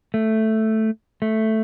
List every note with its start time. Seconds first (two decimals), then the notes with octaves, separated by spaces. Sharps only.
0.14 A3
1.22 A3